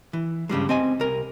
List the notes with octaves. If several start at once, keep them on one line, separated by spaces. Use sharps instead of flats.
E3
G2 C#3 G3 G#3
C4 D#5 G#5
C2 A#4